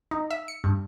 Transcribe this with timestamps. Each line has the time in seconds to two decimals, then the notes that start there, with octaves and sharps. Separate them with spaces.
0.11 D#4
0.31 E5
0.48 C#7
0.64 G2